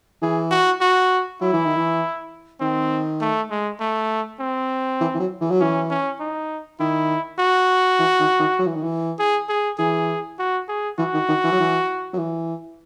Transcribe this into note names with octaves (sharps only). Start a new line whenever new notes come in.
E3 G#4
F#4
F#4
F#3 E4
E3
D#3
E3
D#3 C4
A3
G#3
A3
C4
E3
E3
F#3
E3
F#3
E3 C#4
C#4
D#4
D#3 E4
F#4
E3
D#3
D#3
F#3
E3
D#3
E3
G#4
G#4
E3 G#4
F#4
G#4
E3 F#4
D#3
D#3
E3
F#3
E3
F#3
E3